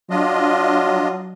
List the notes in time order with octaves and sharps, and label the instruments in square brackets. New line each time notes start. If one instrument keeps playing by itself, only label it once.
[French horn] F#3 [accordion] D4 F4 D#5